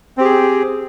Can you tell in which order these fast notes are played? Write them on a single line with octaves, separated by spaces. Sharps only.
C4 G4 G#4